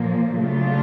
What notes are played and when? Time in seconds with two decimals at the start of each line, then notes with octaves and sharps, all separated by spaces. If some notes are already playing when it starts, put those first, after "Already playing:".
Already playing: A#2 F3 A#3
0.35 C#3 F#3 A3 D4 F4